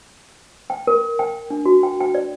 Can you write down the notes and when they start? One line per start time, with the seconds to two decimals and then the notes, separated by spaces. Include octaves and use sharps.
0.70 G5
0.87 A#4
1.19 G5
1.50 D4
1.66 F#4
1.83 G5
2.01 G5
2.15 D5